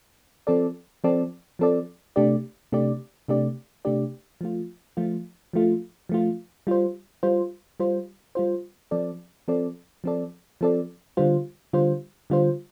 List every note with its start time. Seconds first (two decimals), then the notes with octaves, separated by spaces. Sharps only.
0.47 F3 C4 A4 D5
1.04 F3 C4 A4 D5
1.59 F3 C4 A4 D5
2.16 C3 A3 D4 G4 D5
2.72 C3 A3 D4 G4 D5
3.28 C3 A3 D4 G4 D5
3.85 C3 A3 D4 G4 D5
4.41 F3 A3 F4
4.97 F3 A3 F4
5.53 F3 A3 F4
6.09 F3 A3 F4
6.67 G3 F4 C5
7.23 G3 F4 C5
7.80 G3 F4 C5
8.35 G3 F4 C5
8.91 F3 C4 A4 D5
9.48 F3 C4 A4 D5
10.04 F3 C4 A4 D5
10.61 F3 C4 A4 D5
11.17 D3 G3 F4 C5
11.73 D3 G3 F4 C5
12.30 D3 G3 F4 C5